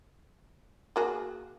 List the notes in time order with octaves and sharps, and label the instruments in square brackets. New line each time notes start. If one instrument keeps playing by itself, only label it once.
[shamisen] A#3 F#4 G#4